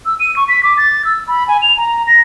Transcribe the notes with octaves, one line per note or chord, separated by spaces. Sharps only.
E6
D#7
C#6
B6
D6
A6
E6
B5
G#5
F7
A#5
A#6